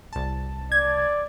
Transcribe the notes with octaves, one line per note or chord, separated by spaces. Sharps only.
C2 A5
D5 G#6